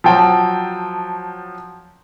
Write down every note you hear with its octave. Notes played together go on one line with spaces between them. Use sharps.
F3 F#3 G5 A5